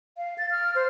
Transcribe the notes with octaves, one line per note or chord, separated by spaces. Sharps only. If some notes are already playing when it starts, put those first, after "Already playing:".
F5
A6
F6
C5